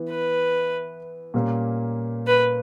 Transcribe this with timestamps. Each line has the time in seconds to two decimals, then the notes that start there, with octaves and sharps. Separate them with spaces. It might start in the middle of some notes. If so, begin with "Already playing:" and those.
Already playing: E3 B3 E4
0.10 B4
1.34 A#2 G3 A#3 C#4
2.27 B4